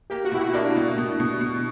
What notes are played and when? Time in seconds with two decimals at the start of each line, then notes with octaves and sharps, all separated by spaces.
0.10 A#3 G4
0.25 F#4
0.32 B2 E4
0.39 F#4
0.49 E4
0.53 A#3 D4
0.76 B2
0.98 B2
1.20 B2
1.41 B2